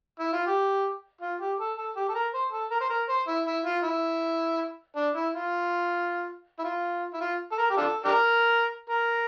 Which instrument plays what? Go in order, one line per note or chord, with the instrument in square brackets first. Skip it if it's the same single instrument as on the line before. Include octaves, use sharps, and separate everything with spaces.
[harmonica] E4
F4
G4
F4
G4
A4
A4
G4
A4
A#4
C5
A4
A#4
C5
A#4
C5
E4
E4
F4
E4
D4
E4
F4
E4
F4
E4
F4
A4
A#4
G4
D4 F4 A4
D4 G4 A#4
A#4